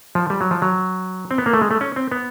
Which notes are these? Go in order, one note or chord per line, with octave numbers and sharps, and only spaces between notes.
F3
G3
F#3
F3
F#3
C4
B3
A#3
A3
G#3
A3
C#4
C4
B3